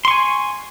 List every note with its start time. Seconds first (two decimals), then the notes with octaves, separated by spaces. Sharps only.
0.05 C6
0.08 C#6
0.11 G#5